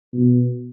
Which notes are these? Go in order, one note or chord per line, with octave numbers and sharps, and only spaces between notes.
B2